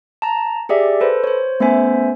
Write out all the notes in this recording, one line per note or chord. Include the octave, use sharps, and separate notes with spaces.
A5 A#5
G4 G#4 D5 E5
A4 B4 C5
C5 C#5
A3 B3 C#4 C5 E5 G#5